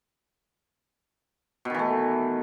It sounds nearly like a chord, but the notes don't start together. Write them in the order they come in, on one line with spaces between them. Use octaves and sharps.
B2 D#3 E3 A3